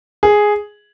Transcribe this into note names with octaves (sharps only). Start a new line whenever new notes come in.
G#4